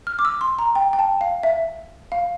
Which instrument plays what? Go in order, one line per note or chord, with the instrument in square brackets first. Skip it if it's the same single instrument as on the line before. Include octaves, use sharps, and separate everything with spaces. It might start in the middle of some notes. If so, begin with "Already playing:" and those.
[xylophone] F6
D6
E6
C6
A#5
G5
G5
A5
F5
E5
F5